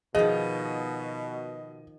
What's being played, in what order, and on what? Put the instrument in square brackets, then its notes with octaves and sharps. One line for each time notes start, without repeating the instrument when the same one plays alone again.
[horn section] B2 [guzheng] D#3 F3 [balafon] G#4 [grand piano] D#5